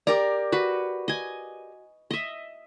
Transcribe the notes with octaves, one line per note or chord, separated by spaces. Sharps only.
G4 A#4 D5 A#5
F#4 B4
D#5 G#5
D#5 E5